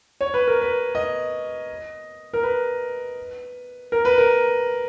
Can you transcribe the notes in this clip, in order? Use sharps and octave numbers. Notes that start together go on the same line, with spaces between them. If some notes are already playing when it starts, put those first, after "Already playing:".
C#5
B4
A#4
B4
D#5
A#4
B4
A#4
B4
A#4